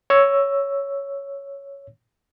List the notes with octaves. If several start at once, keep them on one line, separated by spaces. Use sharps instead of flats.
C#5 E6